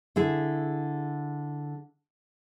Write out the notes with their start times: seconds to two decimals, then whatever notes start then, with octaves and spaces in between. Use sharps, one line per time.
0.16 D3 E4 G#4